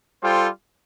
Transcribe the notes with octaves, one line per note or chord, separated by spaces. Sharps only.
G3 F4 A4 C5 G5